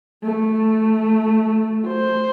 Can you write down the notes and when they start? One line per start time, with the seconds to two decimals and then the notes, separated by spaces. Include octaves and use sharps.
0.23 A3
1.87 C5